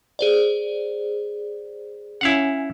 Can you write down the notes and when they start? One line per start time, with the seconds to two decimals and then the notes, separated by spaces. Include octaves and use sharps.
0.19 G#4 C5 D5
2.21 C#4 E4 F5 F#5